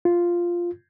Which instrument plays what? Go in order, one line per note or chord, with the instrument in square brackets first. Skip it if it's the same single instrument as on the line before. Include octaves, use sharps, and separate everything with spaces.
[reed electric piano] F4